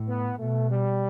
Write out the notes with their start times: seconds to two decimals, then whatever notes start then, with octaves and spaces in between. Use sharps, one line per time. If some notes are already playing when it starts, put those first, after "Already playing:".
Already playing: A2
0.08 B3
0.39 B2 A3
0.71 G3